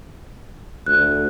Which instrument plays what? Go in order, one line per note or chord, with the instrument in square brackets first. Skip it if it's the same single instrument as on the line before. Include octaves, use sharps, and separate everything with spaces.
[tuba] D2 [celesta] F#6